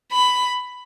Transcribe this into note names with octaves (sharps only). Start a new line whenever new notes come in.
B5